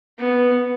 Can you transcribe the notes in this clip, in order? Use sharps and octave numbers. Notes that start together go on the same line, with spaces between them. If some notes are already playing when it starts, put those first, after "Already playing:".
B3